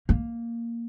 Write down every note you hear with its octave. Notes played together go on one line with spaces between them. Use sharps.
A#3